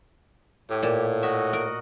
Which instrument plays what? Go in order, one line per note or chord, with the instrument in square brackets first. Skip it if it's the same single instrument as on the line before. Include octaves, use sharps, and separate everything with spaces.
[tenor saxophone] A2 [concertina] G4
[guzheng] A#2
[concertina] F#4 D#5 F#5 [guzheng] E5
[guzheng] A#4